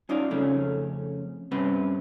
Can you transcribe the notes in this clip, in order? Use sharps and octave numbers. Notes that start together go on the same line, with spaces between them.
C#4 D#4 F4 D5 F5
F2 C#3 A3 C#4
G2 C3 C4 C#4 B4